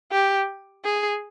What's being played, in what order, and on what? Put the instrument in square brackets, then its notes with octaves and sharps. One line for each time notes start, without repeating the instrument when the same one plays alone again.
[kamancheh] G4
G#4